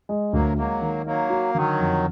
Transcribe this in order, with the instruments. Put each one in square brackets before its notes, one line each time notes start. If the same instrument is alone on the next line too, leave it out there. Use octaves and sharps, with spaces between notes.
[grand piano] G#3
[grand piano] D2 [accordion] F#3 A#3
[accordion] F#3 A#3 [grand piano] G#3
[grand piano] D#3
[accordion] F#3 A#3 [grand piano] D#4
[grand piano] F#4
[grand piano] D3 [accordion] D#3 F#3
[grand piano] F2